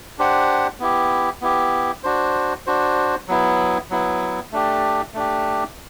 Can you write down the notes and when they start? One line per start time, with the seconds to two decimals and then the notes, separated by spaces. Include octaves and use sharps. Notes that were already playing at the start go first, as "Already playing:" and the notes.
0.19 D4 G4 C5 F#5
0.80 B3 E4 G4
1.41 B3 E4 G4
2.03 D4 F#4 C5
2.66 D4 F#4 C5
3.28 F#3 B3 E4
3.90 F#3 B3 E4
4.52 A3 D4 G4
5.14 A3 D4 G4